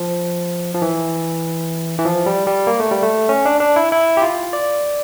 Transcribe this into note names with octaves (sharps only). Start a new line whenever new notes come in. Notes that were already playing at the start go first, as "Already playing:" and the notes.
Already playing: F3
F3
E3
E3
F3
G3
G3
A#3
A3
G3
A3
C#4
D4
D4
E4
E4
G4
F4
D5